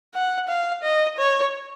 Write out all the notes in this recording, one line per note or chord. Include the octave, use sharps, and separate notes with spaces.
F#5
F5
D#5
C#5